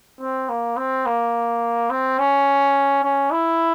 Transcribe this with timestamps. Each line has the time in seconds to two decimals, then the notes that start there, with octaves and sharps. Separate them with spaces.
0.20 C4
0.49 A#3
0.77 C4
1.06 A#3
1.90 C4
2.19 C#4
3.04 C#4
3.31 E4